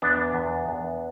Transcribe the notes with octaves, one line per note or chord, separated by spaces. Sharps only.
E2 B3 D4
E2
E2